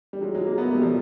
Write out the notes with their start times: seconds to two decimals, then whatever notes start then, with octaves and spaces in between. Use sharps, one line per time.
0.13 G3
0.21 F#3 G#3
0.35 F#3 G#3
0.46 G#3 A#3
0.58 A3 B3
0.71 G3 A3
0.82 F3 G3